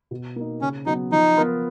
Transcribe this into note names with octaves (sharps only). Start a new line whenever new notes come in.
B2
A#3 D#4
C#3 C#4
F#3 B3 D#4
F3 D#4
B3 F4 A#4